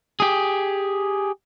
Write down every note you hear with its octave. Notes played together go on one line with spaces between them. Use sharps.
G4 G#4